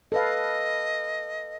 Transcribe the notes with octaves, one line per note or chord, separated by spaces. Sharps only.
A4 B4 D#5 F5